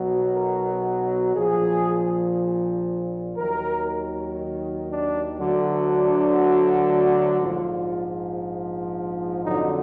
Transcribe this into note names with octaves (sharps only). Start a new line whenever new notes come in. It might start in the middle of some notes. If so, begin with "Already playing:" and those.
Already playing: B1 B2 F#3
A#4
A#1 A#2 F3 G#4
D#2 D#3 F#3 A#4
D4
D2 D3 F#3
D4
A#1 G#2 F3 F4
F2 D3 F#3 D#4